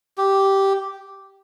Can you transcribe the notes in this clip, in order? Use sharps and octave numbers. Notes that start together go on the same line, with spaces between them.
G4